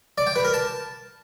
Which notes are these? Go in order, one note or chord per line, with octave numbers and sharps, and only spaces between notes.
D5
G5
B4
A#4
A5